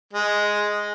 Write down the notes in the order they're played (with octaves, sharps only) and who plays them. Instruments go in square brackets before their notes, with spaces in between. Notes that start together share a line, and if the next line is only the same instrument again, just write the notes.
[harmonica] G#3